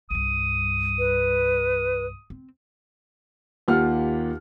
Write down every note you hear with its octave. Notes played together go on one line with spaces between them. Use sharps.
C2 G2 D#6
B4
C4
D#2 A#3 F4 G4 F#5 F6